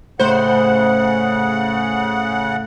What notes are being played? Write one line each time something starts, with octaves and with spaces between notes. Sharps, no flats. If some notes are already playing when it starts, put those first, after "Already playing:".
A2 C#3 C5 F#5